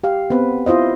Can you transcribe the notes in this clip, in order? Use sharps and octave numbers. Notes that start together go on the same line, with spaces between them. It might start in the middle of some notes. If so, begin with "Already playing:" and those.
G4 F5
B3 C4 B4
E4 F4 C5 D#5